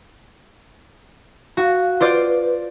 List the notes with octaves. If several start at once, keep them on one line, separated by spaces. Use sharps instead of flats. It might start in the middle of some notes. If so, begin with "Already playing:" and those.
F#4 F5
F4 B4 C5 D5